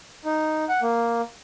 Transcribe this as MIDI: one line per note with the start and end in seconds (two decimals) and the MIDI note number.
0.25 0.65 63
0.69 0.80 78
0.82 1.21 58